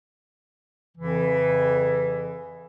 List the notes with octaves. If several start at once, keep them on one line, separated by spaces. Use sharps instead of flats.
F2 C#3 E3